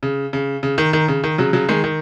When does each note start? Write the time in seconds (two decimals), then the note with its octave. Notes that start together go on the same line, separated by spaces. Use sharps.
0.03 C#3
0.33 C#3
0.63 C#3
0.78 D#3
0.93 D#3
1.08 C#3
1.24 D#3
1.38 C#3 F#3
1.53 C#3 F#3
1.69 D#3 G#3
1.84 D#3